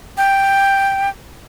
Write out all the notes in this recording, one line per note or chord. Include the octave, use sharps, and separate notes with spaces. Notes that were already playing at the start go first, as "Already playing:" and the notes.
G5